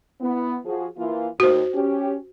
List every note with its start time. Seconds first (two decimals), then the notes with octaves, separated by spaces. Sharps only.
0.21 B3 E4
0.65 F3 F#4 G#4
0.96 E3 A#3 F4
1.40 D#2 F#4 C5
1.74 C#4 G4